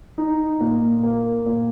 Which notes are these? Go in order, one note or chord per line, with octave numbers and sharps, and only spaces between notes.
D#4
A#2
A#3
A#2